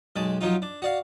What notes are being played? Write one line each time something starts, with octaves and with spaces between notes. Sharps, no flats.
B1 G#3 A5
F3 F#3 D#4 F4
D4
F#4 D5 F5